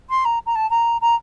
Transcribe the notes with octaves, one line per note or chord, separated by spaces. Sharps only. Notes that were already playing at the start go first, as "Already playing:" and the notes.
C6
A#5
A#5
A5
A#5
A#5